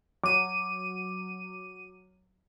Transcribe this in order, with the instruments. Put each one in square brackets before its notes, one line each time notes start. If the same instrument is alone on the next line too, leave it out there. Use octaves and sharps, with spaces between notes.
[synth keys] F#3 D#7 [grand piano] D6